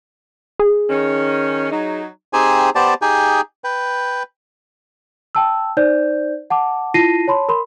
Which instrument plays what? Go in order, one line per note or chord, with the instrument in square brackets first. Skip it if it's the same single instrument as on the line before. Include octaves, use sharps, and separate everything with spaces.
[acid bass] G#4
[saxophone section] D#3 C#4
F#3 D#4
[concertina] C4 D#4 G4 G#4 C5 G#5
B3 G4 C5 D5 A5
D#4 G4 G#4 G5 G#5
B4 G5
[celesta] G5 A5 E6
D#4 C5 D5 G6
F#5 A5 D6
E4 F4 A5 A#6 C7 D#7
C#5 A5 B5 C6
A#4 B5 C6